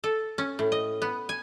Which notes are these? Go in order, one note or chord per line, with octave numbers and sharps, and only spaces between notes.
A4
C#4
A2
D#5
B3
G#5